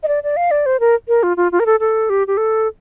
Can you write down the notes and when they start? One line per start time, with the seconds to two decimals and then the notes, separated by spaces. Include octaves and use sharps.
0.03 D#5
0.08 D5
0.23 D5
0.37 F5
0.51 D5
0.66 C5
0.80 A#4
1.08 A#4
1.23 F4
1.37 F4
1.52 F4
1.60 A#4
1.66 A4
1.80 A4
2.10 G4
2.27 G4
2.37 A4